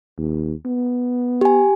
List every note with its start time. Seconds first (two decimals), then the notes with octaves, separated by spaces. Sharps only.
0.18 D#2
0.66 B3
1.41 G4 G#5